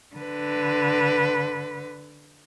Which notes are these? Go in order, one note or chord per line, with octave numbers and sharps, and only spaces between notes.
D3 B4